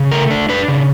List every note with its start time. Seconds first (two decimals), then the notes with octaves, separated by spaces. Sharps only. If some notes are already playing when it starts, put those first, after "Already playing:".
Already playing: C#3
0.11 A3 A#4
0.31 D4
0.49 D4 B4
0.68 C#3